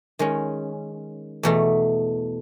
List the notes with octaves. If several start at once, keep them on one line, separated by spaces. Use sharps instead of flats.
D#3 G#3 C#4
E2 B2 A3